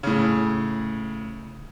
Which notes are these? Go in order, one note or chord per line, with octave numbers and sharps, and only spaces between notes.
A2 C#3